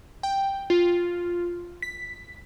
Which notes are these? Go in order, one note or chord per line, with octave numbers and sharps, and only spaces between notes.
G5
F4
B6